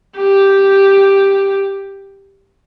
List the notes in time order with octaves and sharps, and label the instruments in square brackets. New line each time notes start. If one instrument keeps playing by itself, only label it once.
[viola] G4